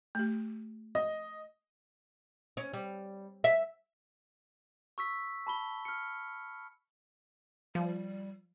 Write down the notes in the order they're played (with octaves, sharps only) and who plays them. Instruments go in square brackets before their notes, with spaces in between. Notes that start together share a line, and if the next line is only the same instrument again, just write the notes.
[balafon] A3 G4
[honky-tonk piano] D#5
[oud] C#4
G3
E5
[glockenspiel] C#6 E6 B6
A5 B5 G7
F6 C#7
[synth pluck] F3 [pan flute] G3